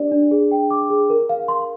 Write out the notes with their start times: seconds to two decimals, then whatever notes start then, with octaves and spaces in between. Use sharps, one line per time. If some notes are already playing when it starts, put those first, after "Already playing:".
Already playing: D4 G4 D5
0.12 D4
0.31 G#4
0.51 G5
0.71 D6
0.90 G#4
1.10 A#4
1.29 F5
1.48 C6